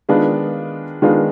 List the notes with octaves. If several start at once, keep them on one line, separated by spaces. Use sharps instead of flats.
D#3 G#3 B3 D4 F4
D#3 G#3 B3 D4 F4